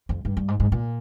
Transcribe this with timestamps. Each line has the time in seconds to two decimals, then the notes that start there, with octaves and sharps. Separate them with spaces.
0.09 F2
0.25 G2
0.37 G2
0.48 G#2
0.60 G#2
0.72 A#2